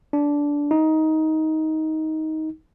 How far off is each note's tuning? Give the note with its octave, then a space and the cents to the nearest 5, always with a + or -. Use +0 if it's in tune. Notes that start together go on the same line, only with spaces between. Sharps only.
D4 -15
D#4 +15